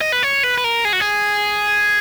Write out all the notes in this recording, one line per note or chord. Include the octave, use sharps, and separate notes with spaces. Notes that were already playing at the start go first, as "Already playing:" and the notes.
D#5
B4
C#5
B4
B4
A#4
G#4
F#4
G#4